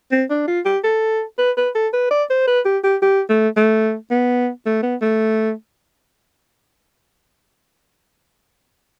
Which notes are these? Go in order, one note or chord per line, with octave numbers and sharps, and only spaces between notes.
C4
D4
F4
G4
A4
B4
B4
A4
B4
D5
C5
B4
G4
G4
G4
A3
A3
B3
A3
B3
A3